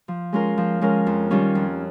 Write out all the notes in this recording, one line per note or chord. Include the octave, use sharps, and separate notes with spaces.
F3
G#3 C#4 F4 A#4
F3
G#3 C#4 F4 A#4
F2
D#3 G3 C#4 F4
F2